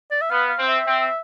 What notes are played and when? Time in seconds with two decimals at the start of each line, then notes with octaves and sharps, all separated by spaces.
0.11 D5
0.22 E5
0.30 B3 F5
0.49 F5
0.58 C4
0.67 E5
0.87 C4